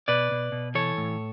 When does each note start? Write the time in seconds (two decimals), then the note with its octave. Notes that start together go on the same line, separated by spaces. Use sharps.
0.08 B2 B4 D5
0.31 B2
0.52 B2
0.75 E3 A4 C#5
0.97 A2